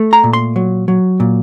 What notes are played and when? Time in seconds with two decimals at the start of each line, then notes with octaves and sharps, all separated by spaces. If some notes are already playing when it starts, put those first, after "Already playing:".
Already playing: A3
0.13 A#5
0.24 A#2
0.33 C6
0.56 F#3
0.88 F#3
1.20 A#2